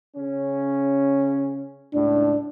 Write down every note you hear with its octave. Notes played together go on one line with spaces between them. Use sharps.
C#3 C#4
C#2 A2 D4